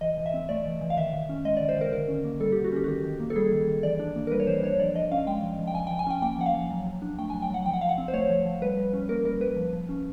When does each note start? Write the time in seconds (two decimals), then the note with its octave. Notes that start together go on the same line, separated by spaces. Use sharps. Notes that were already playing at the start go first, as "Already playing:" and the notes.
0.01 E3 D#5
0.18 E3
0.26 E5
0.34 C4
0.49 A3 D5
0.66 E3
0.81 E3
0.90 F5
0.97 D#3 E5
1.13 D#3
1.29 C#4
1.45 G#3 D#5
1.57 D#3 D5
1.69 C5
1.76 D#3 A#4
1.93 D3 A#4
2.08 C#4
2.24 A#3
2.40 G3 A4
2.52 D3 G4
2.64 F#4
2.72 C#4 G4
2.84 F#4
2.88 D#3 G4
3.04 D#3
3.20 A#3
3.30 A4
3.36 G3 G#4
3.52 D#3
3.68 D#3
3.83 E3 D5
3.99 D4
4.16 A#3
4.27 A#4
4.32 G3 B4
4.40 C#5
4.47 E3 C5
4.63 D4 C#5
4.79 F3 D5
4.95 F3 D#5
5.11 C#4 F5
5.27 G#3 G5
5.43 F3
5.59 F3
5.67 G5
5.74 F3 G#5
5.87 F3 G5
5.99 G#5
6.07 C#4 G5
6.22 A#3 G5
6.38 F3 F#5
6.46 F5
6.54 F3
6.71 F#3
6.86 F#3
7.02 D4
7.19 A3 G5
7.30 F#3 G#5
7.42 G5
7.50 F#3 F#5
7.66 F3 G5
7.73 F#5
7.81 F3 F5
7.89 F#5
7.98 C4
8.08 C5
8.13 A3 C#5
8.30 F3
8.46 F3
8.62 G3 B4
8.77 G3
8.93 C#4
9.09 A#3 A#4
9.25 G3 A#4
9.41 G3 B4
9.57 F3
9.73 F3
9.89 C#4